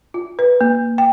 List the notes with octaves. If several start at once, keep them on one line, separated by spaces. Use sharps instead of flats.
F4
B4
A#3
G5